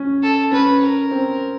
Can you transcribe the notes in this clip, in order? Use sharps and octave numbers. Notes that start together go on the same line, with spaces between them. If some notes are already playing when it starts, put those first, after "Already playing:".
Already playing: C#4
A4
C#4 B4
A#4
C4